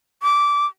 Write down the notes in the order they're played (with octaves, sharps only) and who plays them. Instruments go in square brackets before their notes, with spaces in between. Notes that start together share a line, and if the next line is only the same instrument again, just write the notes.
[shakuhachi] D6